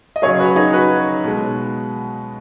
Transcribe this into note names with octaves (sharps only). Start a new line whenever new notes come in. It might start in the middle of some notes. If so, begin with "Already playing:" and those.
D#5
C#3 F#3 G#4 C#5
F#4 B4
D#4 G#4
F#4 B4
B2 G#3